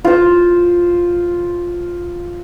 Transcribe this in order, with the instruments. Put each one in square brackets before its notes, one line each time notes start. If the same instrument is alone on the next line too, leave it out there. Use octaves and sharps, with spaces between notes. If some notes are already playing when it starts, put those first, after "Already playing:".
[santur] F4 C5